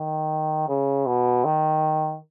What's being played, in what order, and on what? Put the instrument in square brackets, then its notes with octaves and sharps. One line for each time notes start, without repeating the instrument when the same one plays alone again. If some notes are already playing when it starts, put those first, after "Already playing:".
Already playing: [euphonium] D#3
C#3
B2
D#3